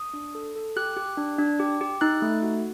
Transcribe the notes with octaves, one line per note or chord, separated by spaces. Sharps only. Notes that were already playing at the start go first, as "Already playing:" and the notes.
Already playing: D#6
D4
A4
A4
G4 F#6
G4
D4
D4
G4
G4
D#4 F#6
A3
F#4